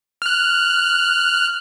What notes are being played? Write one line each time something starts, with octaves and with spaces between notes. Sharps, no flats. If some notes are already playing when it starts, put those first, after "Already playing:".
F6 F#6